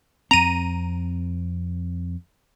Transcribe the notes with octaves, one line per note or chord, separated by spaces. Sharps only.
F2 C4 A#5 D#7